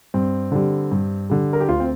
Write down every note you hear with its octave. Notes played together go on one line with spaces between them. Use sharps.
G2 C4
D3 G3
G2
D3 G3
A#4
G4
D2 F4
C4